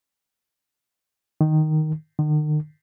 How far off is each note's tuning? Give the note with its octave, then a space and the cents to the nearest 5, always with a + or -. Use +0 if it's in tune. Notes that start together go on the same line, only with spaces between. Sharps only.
D#3 -5
D#3 -45